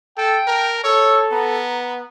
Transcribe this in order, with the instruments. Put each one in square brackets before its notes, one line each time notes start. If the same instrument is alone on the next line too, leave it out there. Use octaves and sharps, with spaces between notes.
[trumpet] A4 [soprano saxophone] G5
[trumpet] A#4 [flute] A5
[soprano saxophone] A4 [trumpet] C#5 [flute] E6
[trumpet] B3 [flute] A#5